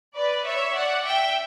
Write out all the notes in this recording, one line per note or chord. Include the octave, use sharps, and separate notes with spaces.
B4 D5
C#5 E5
D5 F#5
E5 G5